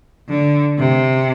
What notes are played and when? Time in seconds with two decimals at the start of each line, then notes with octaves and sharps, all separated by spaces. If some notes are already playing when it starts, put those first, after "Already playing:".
0.29 D3
0.78 C3